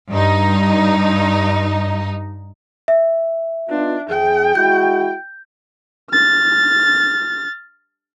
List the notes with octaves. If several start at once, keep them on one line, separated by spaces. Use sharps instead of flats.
G2 D#4
E5
B3 D4 D#4 F4
F2 G#4 G5
G#3 E4 F#4 G6
F6 A6